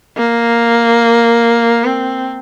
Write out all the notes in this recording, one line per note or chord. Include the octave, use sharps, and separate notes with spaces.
A#3
C4